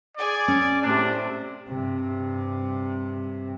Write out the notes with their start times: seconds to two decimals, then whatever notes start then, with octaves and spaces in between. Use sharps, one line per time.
0.17 G#4 D5 G#5
0.48 C#4
0.83 A2 C3 D4
1.69 G2 C3